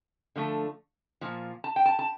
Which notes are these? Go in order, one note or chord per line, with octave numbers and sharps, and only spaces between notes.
D3 F3 A3
A#2 F3
A5
G5
A5
A5